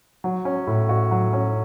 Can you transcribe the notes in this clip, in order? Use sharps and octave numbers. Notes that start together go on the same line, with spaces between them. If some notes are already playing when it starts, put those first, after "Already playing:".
F#3
C#4
A2
F#4
F#3
C#4